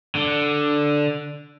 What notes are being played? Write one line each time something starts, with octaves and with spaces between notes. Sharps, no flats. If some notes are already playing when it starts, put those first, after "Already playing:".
D3